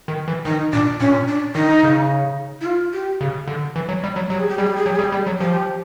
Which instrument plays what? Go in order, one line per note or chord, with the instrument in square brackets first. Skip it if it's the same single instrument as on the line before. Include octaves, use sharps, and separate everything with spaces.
[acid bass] D#3
E3
[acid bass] D#3 [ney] D#4
[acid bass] A#2 [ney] D4
[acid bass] A#2 [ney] C#4
[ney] D4
[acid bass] D#3 [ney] D#4
[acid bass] C#3
[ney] E4
F4
G4
[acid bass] C#3
D3
E3
F#3
G3
F#3
[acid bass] F#3 [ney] G4
[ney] G#4
G4
[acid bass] G3 [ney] G#4
[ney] G4
G#4
[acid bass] F#3 [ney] G4
[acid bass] G3 [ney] G#4
[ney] G4
[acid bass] G3
F#3
[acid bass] F3 [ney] G4